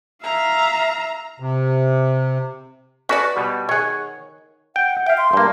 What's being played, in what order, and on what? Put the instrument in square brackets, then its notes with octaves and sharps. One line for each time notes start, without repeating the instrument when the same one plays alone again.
[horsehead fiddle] E5 F5 [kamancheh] A#5
[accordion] C3
[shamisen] C#4 B4 D5 [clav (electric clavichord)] F#4
[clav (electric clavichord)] B2 G3
[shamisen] D#3 G#4 [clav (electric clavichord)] C#5 F#5
[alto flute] F#5 [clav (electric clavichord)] G5
[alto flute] E5 [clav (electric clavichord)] F5 G5
[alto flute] C6
[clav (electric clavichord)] G2 A#3